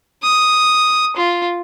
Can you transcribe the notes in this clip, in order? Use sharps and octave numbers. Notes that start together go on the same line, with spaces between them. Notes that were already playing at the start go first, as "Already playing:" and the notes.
D#6
F4